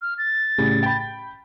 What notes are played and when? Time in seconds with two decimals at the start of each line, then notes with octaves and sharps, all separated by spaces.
0.02 F6
0.18 A6
0.58 A2 C#3 G3
0.83 G5 B5